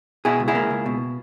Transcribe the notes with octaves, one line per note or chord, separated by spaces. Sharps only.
B2 E4 G#4
C#2
E4 G#4
A#3
C#2
B2